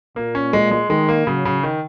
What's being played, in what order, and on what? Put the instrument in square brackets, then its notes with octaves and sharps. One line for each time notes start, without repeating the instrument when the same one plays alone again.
[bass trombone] A#2 [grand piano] A#3
[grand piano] C#4
G#3
G#3
[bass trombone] D#3 [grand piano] G#3
[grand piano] A#3
[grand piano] C#3 [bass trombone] F#3
[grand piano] C#3
D#3